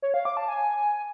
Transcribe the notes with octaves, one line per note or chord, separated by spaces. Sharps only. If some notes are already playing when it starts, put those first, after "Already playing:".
C#5
F5
D6
A5
G#5